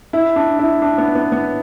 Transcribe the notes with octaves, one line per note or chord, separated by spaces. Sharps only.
E4
D4
E4
D4
B3
B3
B3